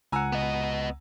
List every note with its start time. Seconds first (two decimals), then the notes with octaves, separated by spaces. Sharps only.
0.12 C#2 F#5 G#5 A#5 E6
0.32 B3 D#5